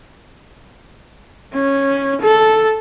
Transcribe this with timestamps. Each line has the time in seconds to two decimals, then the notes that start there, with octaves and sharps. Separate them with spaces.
1.54 C#4
2.21 A4